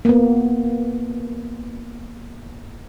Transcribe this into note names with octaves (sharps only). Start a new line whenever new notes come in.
A#3 B3